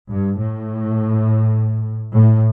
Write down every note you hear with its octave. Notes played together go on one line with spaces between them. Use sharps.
G2
A2
A2